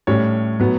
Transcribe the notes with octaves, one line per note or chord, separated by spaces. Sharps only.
A2 G3 C#4 C#5
A2 F#3 B3